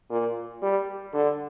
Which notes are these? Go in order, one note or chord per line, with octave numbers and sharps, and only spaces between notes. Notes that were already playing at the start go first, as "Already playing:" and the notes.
A#2
G3
D3